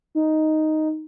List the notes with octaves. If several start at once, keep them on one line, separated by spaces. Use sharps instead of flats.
D#4